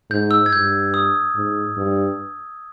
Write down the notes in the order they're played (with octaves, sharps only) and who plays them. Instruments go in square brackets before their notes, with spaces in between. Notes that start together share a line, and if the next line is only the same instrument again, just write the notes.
[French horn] G#2 [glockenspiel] G6
[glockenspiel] E6
G#6
[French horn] G2 [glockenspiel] G6
[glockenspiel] D#6
[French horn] G#2
G2